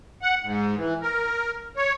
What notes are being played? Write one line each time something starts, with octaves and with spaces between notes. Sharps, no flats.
F#5
G#2
E3
A#4
C#5